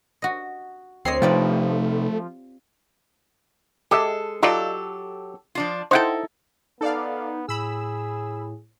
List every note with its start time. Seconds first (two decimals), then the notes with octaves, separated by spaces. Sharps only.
0.22 F#4 D#5
1.05 D2 C4 C#5 D#5 C7
1.22 C3 F3 A3 D#4 F4 G4 B4 D5
3.91 G#3 G4 A4 D#5 E5
4.43 F#3 D#4 F4 G4 A4 D5
5.55 F3 D4 F4
5.91 D#4 E4 A4 C5 F#5 G5
6.81 B3 D#4 A4 D5 F5
7.49 A2 G#4 B5 E6